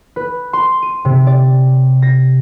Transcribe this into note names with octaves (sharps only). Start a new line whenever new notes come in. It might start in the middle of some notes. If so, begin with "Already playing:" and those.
B4
C6
D#7
C3
D5
A#6